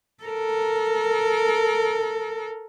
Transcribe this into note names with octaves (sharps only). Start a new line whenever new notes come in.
A4 A#4